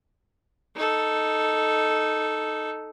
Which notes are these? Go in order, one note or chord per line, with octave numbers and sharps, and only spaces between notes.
D#4 A4